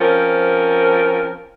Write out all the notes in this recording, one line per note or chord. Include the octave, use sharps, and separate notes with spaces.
F3 C4 C#4 A#4